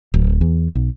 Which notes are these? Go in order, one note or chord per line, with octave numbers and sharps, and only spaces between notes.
D1
E2
B1